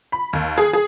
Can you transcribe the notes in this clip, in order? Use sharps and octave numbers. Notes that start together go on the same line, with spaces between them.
B5
D#2
G#4
G#4